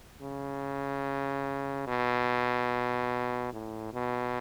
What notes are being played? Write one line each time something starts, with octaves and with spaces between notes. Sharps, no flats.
C#3
B2
A2
B2